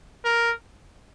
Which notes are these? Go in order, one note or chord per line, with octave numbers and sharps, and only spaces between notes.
A#4